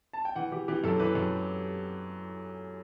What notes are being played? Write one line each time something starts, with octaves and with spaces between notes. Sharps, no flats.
A5
G5
E3 F#5
E3 G4
E3 G4
F#2 A4
E3 B4
F#2